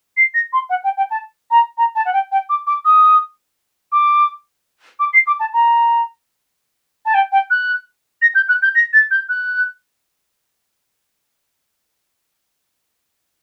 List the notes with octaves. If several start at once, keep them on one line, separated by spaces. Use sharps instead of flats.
C7
A#6
C6
F#5
G5
G5
A5
A#5
A#5
A5
F#5
G5
G5
D6
D6
D#6
D6
D6
C7
D6
A5
A#5
A5
G5
G5
F#6
A#6
G6
F#6
G6
A#6
A6
G6
F#6